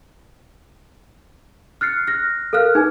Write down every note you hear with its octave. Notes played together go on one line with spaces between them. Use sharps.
F6 F#6 A6 C7 C#7
F6 F#6 A#6
A4 A#4 F5 F6 F#6
D#4 G#4 B4 G#5